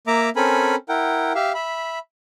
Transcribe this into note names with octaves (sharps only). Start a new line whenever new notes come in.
A#3 E5 A#5 D6
C4 C#4 A4 A#4 G#5 B5
E4 A#4 F#5 G5
G4 E5 F5
E5 B5